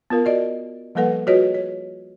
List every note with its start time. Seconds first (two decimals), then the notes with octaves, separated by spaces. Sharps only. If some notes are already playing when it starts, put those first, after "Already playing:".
0.10 B3 F4 A#4 F5
0.25 F#4 D5 D#5
0.95 F3 G3 A#3 A4 B4 F#5
1.27 F4 F#4 G#4 B4 C#5 D#5
1.54 C#5